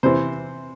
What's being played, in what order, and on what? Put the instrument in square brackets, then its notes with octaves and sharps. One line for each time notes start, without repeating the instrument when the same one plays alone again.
[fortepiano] C3 E3 C5